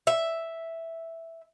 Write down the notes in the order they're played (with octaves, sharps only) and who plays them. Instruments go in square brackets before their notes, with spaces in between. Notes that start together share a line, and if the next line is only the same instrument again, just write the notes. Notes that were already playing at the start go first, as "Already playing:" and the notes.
[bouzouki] E5